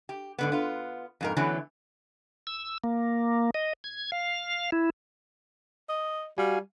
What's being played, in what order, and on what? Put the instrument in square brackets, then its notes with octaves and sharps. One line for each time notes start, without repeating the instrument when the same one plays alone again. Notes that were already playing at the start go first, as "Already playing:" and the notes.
[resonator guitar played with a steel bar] G4
G#2 D3 B3
B3 F4
F2 G#2 A#4
D3 E3 F#3 A3 B3 C#4
[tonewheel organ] E6
A#3
D#5
G#6
F5
E4
[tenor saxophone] D#5
[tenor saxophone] G3 [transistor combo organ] F#4 F5 G#5